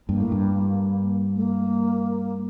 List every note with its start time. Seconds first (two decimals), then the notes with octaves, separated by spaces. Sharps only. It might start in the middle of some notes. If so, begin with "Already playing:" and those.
0.08 G2 A#3
0.20 A2
0.32 G2
1.36 A3
1.42 A#3